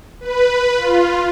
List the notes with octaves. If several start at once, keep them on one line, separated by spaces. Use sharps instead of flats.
B4
F4